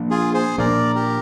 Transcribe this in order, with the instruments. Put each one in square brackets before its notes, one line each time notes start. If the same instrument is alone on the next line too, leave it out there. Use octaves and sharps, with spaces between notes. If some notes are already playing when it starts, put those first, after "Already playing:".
Already playing: [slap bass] A#2 F3 A#3 D4
[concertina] F4 G#4
G#4 C5
[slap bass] A#2 F3 A#3 D4 [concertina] A#4 D5
[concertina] G4 A#4